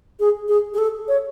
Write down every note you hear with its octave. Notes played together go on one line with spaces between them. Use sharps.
G#4
G#4
G#4
A4
C#5